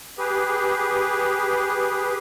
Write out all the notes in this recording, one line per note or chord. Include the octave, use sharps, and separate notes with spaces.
G4 G#4 B4